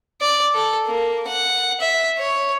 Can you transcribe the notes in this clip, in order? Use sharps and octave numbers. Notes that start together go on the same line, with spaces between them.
D5
A4
A#3
F#5
E5
C#5